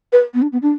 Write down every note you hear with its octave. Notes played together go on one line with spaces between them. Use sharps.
B4
B3
D4
B3
D4